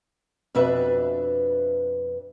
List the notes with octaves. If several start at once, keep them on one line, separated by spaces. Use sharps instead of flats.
F2 B2 D4 B4 E5